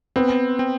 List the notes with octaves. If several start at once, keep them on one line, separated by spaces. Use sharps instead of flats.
B3 C4
C4